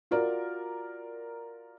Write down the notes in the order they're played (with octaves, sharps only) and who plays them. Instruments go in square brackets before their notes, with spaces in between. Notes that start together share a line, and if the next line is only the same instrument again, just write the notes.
[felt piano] F4 F#4 A#4 D5